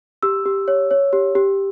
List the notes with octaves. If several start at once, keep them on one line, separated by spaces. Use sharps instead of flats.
G4 E6
G4
C#5
C#5
G4
G4